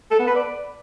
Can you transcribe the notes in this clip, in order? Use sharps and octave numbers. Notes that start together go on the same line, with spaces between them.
A4
B3
B4
D5